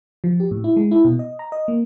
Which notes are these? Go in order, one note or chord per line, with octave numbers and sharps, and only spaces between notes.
F3
G4
A2
E4
G#3
E4
B2
D#5
A#5
D#5
A#3